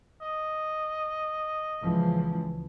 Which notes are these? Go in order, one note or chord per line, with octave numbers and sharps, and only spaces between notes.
D#5
C#2 E3 F3